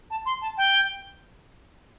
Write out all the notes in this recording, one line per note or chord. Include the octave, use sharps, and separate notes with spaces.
A5
C6
A5
G5